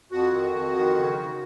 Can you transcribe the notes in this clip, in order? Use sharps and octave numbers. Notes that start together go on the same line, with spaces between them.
F2 F#4
D#3
F2
D#3
C#3
C#3